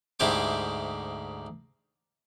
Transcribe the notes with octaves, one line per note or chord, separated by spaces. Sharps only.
D2 G#2 E4 G4 C5 D6